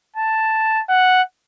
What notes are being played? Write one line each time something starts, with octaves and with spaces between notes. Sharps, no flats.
A5
F#5